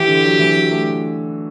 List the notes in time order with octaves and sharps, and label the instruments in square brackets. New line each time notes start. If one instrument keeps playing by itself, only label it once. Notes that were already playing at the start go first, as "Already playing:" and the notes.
Already playing: [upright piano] E3 [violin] G4
[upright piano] D3
F#3
E3
F#3
A3